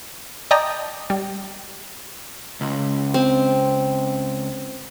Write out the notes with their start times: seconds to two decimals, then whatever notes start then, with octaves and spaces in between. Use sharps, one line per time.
0.51 D5 D#5 G5 A5 A#5
1.10 G3
2.61 C#2
3.14 C4